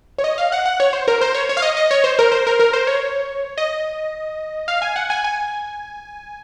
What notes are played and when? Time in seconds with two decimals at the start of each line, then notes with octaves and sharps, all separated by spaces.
0.18 C#5
0.24 D#5
0.38 F5
0.52 F#5
0.66 F#5
0.80 C#5
0.93 C5
1.08 A#4
1.21 C5
1.34 C#5
1.49 C#5
1.57 F5
1.62 D#5
1.77 D#5
1.91 C#5
2.04 C5
2.19 A#4
2.32 C5
2.47 A#4
2.60 A#4
2.73 C5
2.87 C#5
3.58 D#5
4.68 F5
4.82 G#5
4.96 F#5
5.10 G#5
5.24 G#5